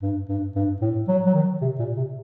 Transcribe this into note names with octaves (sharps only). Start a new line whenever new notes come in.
G2
G2
G2
A2
F#3
F#3
D#3
C3
A#2
C3